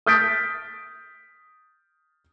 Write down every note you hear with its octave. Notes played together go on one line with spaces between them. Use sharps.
D#6 F6 G6 A6 B6 D7